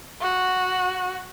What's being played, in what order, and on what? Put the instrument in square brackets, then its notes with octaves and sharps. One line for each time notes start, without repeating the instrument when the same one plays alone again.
[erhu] F#4